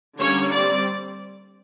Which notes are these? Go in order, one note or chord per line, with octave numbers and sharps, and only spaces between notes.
D3 G3 A#3 C#4 C#5
G3 C4 D5